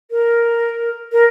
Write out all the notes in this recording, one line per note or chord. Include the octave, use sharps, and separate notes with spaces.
A#4
A#4